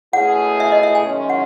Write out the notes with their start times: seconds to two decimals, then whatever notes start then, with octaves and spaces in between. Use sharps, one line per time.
0.13 B2 A3 C#4 E4 G#4 F#5
0.60 E5
0.72 D#5
0.83 E5
0.95 G#5
1.06 F#2 D#3 G#3 C#4
1.29 F#5